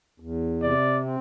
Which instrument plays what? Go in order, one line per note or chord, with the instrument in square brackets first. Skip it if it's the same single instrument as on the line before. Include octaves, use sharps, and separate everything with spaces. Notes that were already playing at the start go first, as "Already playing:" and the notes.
[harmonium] E2
[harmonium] C3 [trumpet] D5
[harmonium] C4